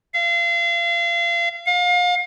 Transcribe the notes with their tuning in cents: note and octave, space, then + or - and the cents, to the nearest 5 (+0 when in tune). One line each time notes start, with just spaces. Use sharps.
F5 -35
F5 +35